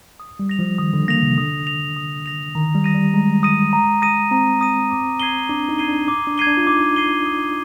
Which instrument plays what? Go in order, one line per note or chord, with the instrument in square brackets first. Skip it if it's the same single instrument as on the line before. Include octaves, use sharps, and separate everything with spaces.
[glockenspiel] D#6
[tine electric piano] G3
[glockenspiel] A#6 F7
[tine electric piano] F3
[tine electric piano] D#3 [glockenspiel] D#6
[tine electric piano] D3
[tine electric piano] A#3 [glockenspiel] A#6 F7
[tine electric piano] C3
[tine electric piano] D3 [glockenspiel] D#6
[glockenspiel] A#6 F7
D#6
A#6 F7
[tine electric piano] D#3 [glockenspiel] A#5
[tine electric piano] G3
[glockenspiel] D#6 A#6 D#7
[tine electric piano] G3
[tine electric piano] G#3 [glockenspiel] A#5
[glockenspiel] D#6 A#6 D#7
A#5
D#6 A#6 D#7
[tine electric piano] C4 [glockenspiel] A#5
[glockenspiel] D#6 A#6 D#7
D6
G#6 C7 D#7 G7
[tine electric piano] D4 [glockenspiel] D6
[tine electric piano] D#4
[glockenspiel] G#6 C7 D#7 G7
[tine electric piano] D4
[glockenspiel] D6
[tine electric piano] D4
[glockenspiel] G#6 C7 D#7 G7
[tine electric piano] D4
F4
[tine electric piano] D#4 [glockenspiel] D6
[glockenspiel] G#6 C7 D#7 G7
D#6